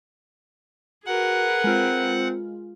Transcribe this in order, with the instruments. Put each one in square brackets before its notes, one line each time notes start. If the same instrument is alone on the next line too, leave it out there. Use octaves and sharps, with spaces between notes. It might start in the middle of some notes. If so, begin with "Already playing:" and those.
[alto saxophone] F#4 [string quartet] G#4 A#4 B4 [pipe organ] F#5
[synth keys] G#3 F4 [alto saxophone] C4